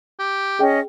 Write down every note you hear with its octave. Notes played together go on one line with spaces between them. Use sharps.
G4
C#4 G#4 D#5 G5